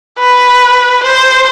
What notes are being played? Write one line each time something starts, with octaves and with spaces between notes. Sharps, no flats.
B4
C5